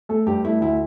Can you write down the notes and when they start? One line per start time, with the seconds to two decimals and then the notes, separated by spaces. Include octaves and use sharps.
0.09 A3 A4
0.26 G2 G4
0.44 A3 E4
0.61 D2 E4